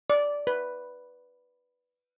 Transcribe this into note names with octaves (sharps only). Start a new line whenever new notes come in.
D5
B4